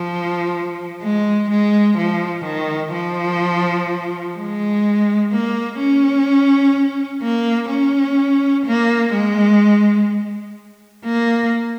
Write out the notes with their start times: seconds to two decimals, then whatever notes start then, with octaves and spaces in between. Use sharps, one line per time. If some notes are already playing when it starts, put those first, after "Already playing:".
Already playing: F3
1.02 G#3
1.50 G#3
1.98 F3
2.45 D#3
2.93 F3
4.36 G#3
5.32 A#3
5.79 C#4
7.22 A#3
7.70 C#4
8.66 A#3
9.14 G#3
11.04 A#3